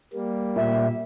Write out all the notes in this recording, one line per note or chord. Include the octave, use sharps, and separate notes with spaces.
G3 A#3
A#2 E5